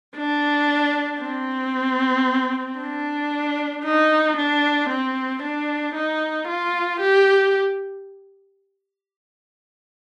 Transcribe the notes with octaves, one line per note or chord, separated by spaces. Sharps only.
D4
C4
D4
D#4
D4
C4
D4
D#4
F4
G4